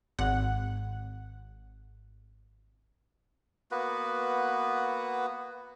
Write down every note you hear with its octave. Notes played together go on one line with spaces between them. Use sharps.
G#1 F#5
A#3 B3 F#4 B4